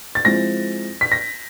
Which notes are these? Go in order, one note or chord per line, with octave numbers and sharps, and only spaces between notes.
A6
F3 G#3 C4 E4 A#6
B6
A#6